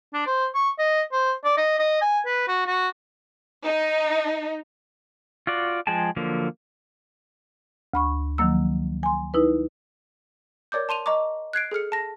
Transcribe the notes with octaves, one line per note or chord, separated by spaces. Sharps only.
D4
C5
C#6
D#5
C5
D5
D#5
D#5
G#5
B4
F#4
F#4
D#4
F4 F#4 D5
F3 G#3 G#4 G5 A5
D3 F3 F#3 A#3
D2 B5 C#6
D#3 F3 F#3 A#3 E6
G#5 C6
D#4 E4 B4
A#4 C#5 D5 D6 G6
A5 C6 D#7 F7
D#5 A#5 C#6 D6
F#6 G#6 C7 D7
G#4 A4 F6 C#7
A5 A#6